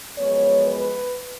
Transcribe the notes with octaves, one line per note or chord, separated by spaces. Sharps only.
F#2 F3 G#3 B3 C#5
B4